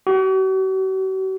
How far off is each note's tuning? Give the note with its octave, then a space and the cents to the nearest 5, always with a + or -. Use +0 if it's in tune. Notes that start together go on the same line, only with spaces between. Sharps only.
F#4 +45